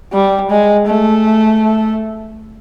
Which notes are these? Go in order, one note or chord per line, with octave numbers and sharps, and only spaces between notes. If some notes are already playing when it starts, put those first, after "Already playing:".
G3
G#3
A3